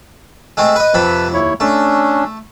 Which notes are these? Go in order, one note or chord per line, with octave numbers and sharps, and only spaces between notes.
G#3 A3 C4
B4 D#5
F2 C3 B4 A5 B5
D#2 E4 C#5
A3 C#4 D4